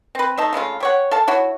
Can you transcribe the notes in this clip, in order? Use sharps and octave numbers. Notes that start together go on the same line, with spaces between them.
C4 B4
A3 D#4 A5
C#3 G#3 A3 F4
G4 C#5 F#5
A4 F5 A5
E4 F#4 C#5